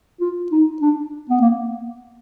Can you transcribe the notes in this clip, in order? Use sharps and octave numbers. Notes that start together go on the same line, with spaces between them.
F4
D#4
D4
B3
A#3